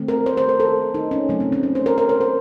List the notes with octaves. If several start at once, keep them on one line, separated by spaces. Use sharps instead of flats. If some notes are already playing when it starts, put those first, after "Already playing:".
Already playing: D#3 A3 C4
A#4
C5
C5
A#4
A4
D#4
C#4
C#3 F#3 A3 C4
C4
C#4
C#4
C5
A#4
A#4
C5
A#4